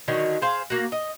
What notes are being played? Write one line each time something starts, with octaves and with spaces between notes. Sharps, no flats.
D3 D#3 F#3 C#5
G#4 C5 F5
A#3 F#4
D#5